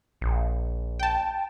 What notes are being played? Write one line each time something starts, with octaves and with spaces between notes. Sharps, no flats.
A#1
G5 A5